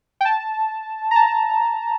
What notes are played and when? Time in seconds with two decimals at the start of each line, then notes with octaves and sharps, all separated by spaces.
0.21 G5
0.25 A5
1.11 A#5
1.16 A5